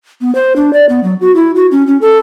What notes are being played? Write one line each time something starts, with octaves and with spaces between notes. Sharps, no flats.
B3
C5
D4
D5
B3
F#3
F#4
E4
F#4
C#4
C#4
A4